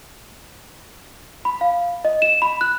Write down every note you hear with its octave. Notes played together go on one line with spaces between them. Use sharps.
B5
F5
D#5
E7
B5
F#6